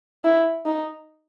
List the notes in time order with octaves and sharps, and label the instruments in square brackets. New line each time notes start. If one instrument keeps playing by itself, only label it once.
[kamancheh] E4
D#4